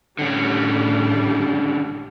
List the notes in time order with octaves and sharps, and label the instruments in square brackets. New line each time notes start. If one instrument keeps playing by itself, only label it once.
[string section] G#1 A2 G3 [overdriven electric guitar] D3 C#4